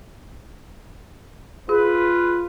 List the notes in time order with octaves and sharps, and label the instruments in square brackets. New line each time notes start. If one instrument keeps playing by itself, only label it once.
[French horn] F4 [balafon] G#4 [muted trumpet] B4